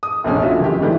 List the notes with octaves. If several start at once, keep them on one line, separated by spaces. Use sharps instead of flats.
D#6
F1 A#1 C3 C#4
F4 F#4 E5
F#1 G4
G#2 D3 E3 G3